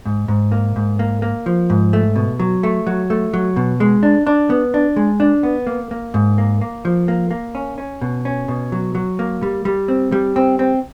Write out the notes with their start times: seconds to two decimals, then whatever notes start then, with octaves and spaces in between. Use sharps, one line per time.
0.05 G#2
0.28 G#2
0.52 A#3
0.76 G#2
0.99 A#3
1.22 A#3
1.46 F3
1.70 G#2
1.93 A3
2.16 B2
2.40 F#3
2.63 A3
2.87 F#3
3.10 A3
3.33 F#3
3.56 B2
3.80 G#3
4.03 D4
4.27 D4
4.50 B3
4.74 D4
4.96 G#3
5.20 D4
5.43 B3
5.67 A#3
5.91 A#3
6.14 G#2
6.38 A#3
6.61 A#3
6.85 F3
7.08 A#3
7.31 A#3
7.55 C#4
7.78 C#4
8.01 B2
8.25 C#4
8.48 B2
8.72 F#3
8.95 F#3
9.19 A#3
9.42 G3
9.65 G3
9.88 C4
10.12 G3
10.36 C4
10.59 C4